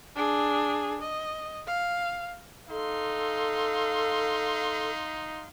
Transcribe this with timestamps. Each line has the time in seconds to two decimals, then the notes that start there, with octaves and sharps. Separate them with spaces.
0.16 D4 G#4
1.02 D#5
1.67 F5
2.71 D#4 A4 F5 C6